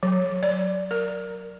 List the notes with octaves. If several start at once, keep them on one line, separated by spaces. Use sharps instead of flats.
F#3
D5
A#4